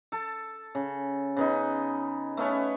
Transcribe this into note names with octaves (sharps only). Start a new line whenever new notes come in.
A4 A5
C#3
C#3 B3 D#4
A3 B3 C#4 C#5